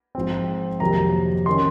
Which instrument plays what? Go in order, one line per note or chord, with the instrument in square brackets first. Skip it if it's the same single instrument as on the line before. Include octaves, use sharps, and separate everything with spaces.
[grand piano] G#2 F3 C4
F2 C3 D#3 F#3 A#3 A#5
D#3 A#3 C#4 C6